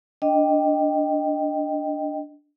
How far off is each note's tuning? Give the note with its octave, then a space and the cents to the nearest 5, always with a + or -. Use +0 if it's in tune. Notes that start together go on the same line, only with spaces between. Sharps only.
D4 +0 D#5 +0 G5 +0